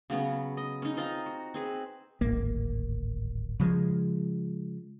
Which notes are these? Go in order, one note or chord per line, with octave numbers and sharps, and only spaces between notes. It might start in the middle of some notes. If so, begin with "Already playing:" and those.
C#3 F#3 B3 C#4
D#5
C#4 D#4
C4 F4 D#5 A#5
F#4
C4 G#4 B4
D1 G#1 A#3
C#3 F3 G#3